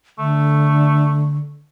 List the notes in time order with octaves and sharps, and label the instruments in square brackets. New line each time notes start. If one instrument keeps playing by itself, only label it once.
[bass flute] D3 [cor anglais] A3